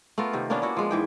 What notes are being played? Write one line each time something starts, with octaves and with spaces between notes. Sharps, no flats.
A3 B3 F4 A#4
C3 D#3
A#3 B3 C#4 D4
D4 E4 F#4
F3 G#3
G#2 E3 G5